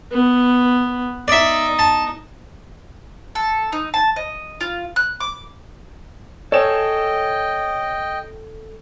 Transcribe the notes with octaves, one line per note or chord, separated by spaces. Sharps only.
B3
D#4 D5 E5
A5
A4
D#4
A5
D#5
F4
F#6
D6
A4 C#5 D#5 G5 G#5 E7